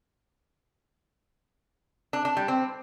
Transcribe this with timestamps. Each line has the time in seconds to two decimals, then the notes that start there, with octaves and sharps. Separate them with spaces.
2.13 D4
2.25 D4
2.37 G3
2.48 C4